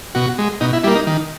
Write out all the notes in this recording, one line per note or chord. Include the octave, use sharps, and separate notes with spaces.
B2 F#4
G#3
B2 D#4
E4
G3 A#3 E4
D#4
D#3